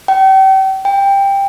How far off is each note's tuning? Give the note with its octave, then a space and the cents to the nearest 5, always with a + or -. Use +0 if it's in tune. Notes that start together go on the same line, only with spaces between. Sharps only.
G5 -35
G5 +15